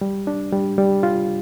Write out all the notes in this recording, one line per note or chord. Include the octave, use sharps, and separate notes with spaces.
G3
D4
G3
G3
F4